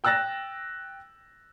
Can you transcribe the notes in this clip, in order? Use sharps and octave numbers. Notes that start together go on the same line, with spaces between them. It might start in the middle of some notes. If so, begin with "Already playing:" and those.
G5 E6 F#6 A6 A#6 E7